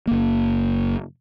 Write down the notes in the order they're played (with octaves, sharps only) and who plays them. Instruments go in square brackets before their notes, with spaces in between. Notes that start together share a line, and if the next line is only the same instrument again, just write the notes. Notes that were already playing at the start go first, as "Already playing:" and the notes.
[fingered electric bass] F#1 A#3